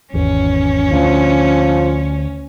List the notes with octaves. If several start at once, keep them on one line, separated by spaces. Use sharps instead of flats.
G#1 E2 C#4
D2 F3 D4